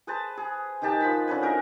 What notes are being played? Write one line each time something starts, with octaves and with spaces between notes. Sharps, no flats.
G#4 B4 C5 A5
G#4
D#3 D#4 G4 A5
F3 F#5 B5
D3 C#4 B4 G#5
D#4 F#4 A#4